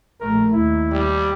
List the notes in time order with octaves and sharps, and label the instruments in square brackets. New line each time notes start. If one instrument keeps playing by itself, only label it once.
[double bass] A#1 A3 [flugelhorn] A#4
[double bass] D#2 [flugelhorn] E4
[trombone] G3